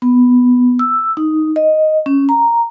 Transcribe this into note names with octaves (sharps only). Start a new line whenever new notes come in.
B3
E6
D#4
D#5
C#4
A#5